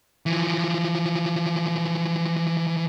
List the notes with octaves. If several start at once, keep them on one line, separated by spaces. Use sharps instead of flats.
E3 F3